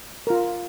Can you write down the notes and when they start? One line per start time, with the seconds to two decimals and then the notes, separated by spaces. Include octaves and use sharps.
0.27 F4 A#4